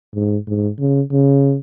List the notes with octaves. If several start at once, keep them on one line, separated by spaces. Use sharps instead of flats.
G#2
G#2
C#3
C#3